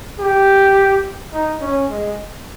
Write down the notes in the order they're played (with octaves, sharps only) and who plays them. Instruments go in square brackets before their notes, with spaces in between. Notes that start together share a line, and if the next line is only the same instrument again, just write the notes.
[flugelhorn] G4
D#4
C#4
G#3